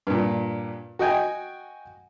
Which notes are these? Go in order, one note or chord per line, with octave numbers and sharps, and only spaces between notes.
G2 A#2
F#4 D#5 G5 G#5